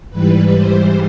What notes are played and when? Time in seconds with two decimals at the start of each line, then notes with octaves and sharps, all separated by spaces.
0.10 G#2 E3 G3 B4
0.56 C5